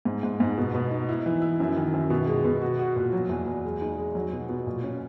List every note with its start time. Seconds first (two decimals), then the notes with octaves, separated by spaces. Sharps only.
0.05 G#2
0.23 G#2
0.40 G#2
0.57 B2
0.75 B2
0.91 D#4
1.09 E4
1.26 E3
1.42 E4
1.60 F#2
1.77 D#3
1.94 F#2
2.10 B2
2.27 G#3
2.44 B2
2.61 F#4
2.79 F#4
2.96 A#2
3.13 F#3
3.29 E2
3.46 E2
3.65 G#3
3.81 D#4
3.98 G#3
4.15 F#3
4.32 B2
4.49 B2
4.67 A#2
4.83 C#4